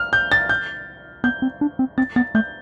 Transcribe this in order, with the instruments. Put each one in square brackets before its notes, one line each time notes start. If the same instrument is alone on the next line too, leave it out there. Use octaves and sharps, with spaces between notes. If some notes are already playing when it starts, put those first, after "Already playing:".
Already playing: [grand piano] F6
G6
A6
G6
[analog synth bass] B3 [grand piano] G6
[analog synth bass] C4
D4
C4
[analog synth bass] C4 [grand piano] A6
[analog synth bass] B3 [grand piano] A6
[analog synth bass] A3 [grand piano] G6